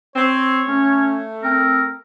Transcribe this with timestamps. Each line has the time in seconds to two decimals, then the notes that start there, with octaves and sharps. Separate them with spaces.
0.16 C4 C#5
0.68 A3 C#4
1.43 C4 A#4